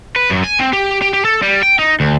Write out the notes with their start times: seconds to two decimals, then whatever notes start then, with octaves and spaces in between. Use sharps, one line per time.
0.16 B4
0.30 F#2
0.44 G#5
0.60 C4
0.73 G4
1.01 G4
1.13 G4
1.25 A4
1.43 G3
1.63 G5
1.79 D#4
2.00 D2